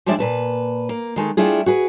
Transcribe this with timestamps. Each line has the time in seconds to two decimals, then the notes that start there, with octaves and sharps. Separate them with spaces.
0.06 F3 G3 G#3 D4 D5 E5
0.19 A#2 B4 A5
0.89 A#3
1.16 D#3 G#3 A3
1.37 G3 A3 D4 E4 F4 G#4
1.66 F#4 G#4 B4